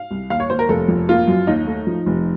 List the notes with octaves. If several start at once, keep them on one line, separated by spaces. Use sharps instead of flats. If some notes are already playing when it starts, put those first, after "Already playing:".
Already playing: F5
C2
D#2 F5
C#5
D#2 C5
A#4
F1 A4
F2
A#3 F4
F#2
D#2 D#4
A3
F3
F1